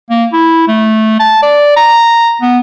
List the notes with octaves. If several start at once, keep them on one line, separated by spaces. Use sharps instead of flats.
A#3
E4
A3
A5
D5
A#5
B3